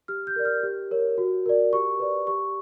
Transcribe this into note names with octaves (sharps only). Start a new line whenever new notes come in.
G4 F6
G6
A#4 D5
F6
G4
A#4 C#5
F#4
A#4 D5
G4 C#6
B4 D5
G4 C#6